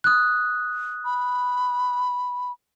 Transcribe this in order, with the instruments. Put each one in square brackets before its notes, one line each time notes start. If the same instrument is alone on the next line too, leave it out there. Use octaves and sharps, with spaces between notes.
[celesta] D#6 F#6
[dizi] B5